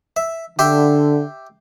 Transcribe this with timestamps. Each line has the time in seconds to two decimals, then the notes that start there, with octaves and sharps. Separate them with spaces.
0.16 E5
0.59 D3 G4 E5 C6